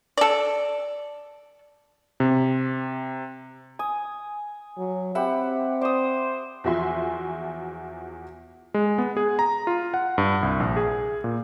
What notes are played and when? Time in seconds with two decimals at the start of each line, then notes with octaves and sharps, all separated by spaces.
0.17 A4 D5
2.20 C3
3.79 G#5 D#6
4.78 F#3
5.15 C4 G4 E5 F#5 B5
5.81 C5 D5 D#6
6.64 E2 F3 F#4 E5 G#5 C6
8.74 G#3
8.98 B3
9.17 G#4
9.39 A#5
9.67 F4
9.94 F#5
10.18 G2
10.43 C2
10.60 A#1
10.76 G#4
11.24 A#2